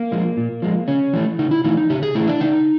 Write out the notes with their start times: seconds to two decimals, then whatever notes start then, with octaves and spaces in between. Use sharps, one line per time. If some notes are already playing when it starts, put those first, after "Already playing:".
Already playing: A#3
0.12 F3 G#3
0.37 A#2
0.62 F3 G#3
0.88 C#3 C#4
1.13 E3 A3
1.39 C#3 D#4
1.51 E4
1.64 E3 A3 D#4
1.77 D#4
1.90 C#3 G4
2.03 G#4
2.15 E3 A3 E4
2.28 D4
2.40 C#3 D#4